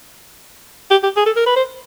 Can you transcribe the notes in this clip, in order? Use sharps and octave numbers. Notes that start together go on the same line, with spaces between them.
G4
G4
G#4
A4
A#4
B4
C5